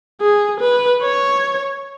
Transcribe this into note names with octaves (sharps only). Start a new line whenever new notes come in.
G#4
B4
C#5